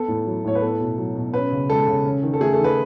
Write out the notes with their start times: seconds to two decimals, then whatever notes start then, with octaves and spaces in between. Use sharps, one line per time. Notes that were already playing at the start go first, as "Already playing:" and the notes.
Already playing: B3 A4
0.08 A2
0.26 F#3
0.44 A2 C#5
0.55 B4
0.62 B3 A4
0.80 B2
0.98 F#3
1.15 B2
1.34 C#4 B4
1.52 C#3
1.70 G#3 A4
1.88 C#3
2.05 C#4
2.23 D#3
2.34 A4
2.41 A3 G#4
2.53 A4
2.59 D#3
2.64 B4